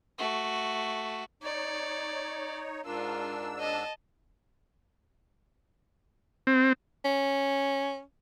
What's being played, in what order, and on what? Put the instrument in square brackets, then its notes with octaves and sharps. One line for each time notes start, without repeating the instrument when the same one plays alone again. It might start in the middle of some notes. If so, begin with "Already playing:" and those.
[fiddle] A3 F#4
[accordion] D#4 C#5 [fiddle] D5
[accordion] G#2 D4 E6 [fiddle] F4 A#4
[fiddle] D#5 A5
[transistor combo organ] C4
[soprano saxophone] C#4